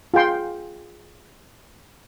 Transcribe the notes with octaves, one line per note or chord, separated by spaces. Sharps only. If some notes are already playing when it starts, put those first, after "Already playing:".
F4 G#4 G5 C6